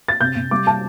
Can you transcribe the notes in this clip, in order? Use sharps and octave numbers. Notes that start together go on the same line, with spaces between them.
A6
C3 G6
C3
G3 D6
A5